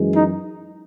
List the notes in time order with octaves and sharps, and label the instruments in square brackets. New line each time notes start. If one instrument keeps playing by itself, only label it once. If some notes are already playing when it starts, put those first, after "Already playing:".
Already playing: [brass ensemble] F#2 E3 G#3
D#4